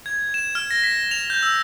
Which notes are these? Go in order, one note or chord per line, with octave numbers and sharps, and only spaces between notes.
G#6
E7
F6
A#6
B6
F7
G6
E6